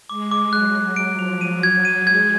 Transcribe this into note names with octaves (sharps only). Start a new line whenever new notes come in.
G#3 D6
D6
F#3 F#6
F#6
F#3
D7
F3
F7
F#3 D#7
G#6
F#3
D#7
G#3
G#6